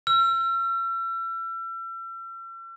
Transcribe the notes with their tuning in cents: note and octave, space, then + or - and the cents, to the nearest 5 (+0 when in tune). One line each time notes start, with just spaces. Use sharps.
E6 +40